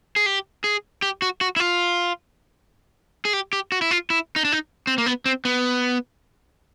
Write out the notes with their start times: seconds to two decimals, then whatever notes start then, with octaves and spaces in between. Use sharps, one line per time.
0.16 G#4
0.26 G4
0.64 G#4
1.02 G4
1.22 F#4
1.41 F#4
1.56 E4
1.60 F4
3.25 G#4
3.33 G4
3.53 G4
3.72 F#4
3.82 E4
3.91 F4
4.10 E4
4.36 D#4
4.45 D4
4.52 D#4
4.87 C4
4.98 A#3
5.06 B3
5.26 C4
5.45 B3